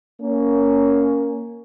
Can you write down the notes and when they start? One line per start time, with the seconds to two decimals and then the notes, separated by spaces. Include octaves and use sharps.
0.21 A#3 C#4